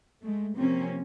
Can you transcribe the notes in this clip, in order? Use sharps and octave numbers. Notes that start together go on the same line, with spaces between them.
G#3 A3
C3 F3 A#3 C4 C#4